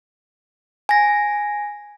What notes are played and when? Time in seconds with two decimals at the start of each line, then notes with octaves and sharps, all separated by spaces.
0.89 G#5 A#6